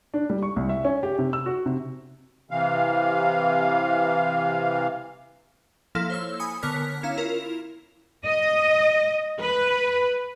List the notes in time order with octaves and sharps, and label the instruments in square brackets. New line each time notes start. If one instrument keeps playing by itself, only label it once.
[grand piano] D4
G3
C#6
C2
E5
C#4
G4
C3
E6
F#4
C3
[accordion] C3 E3 F5
[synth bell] F3 A#3 E4 A4 F5
C5 C#5 E6
G#5 B5 D#6 C#7
D3 B3 A#4 C#5 F6 B6
C#4 E4 F5 A#5
E4 F4 A#4
[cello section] D#5
B4